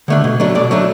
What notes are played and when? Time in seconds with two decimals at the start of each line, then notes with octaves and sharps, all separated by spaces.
0.08 D3 A3 D4
0.24 B2
0.40 F#3 A3 D4
0.55 B2 D5
0.71 F#3 A3 D4